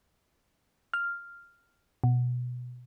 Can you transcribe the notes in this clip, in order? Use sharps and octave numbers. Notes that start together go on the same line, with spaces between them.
F6
B2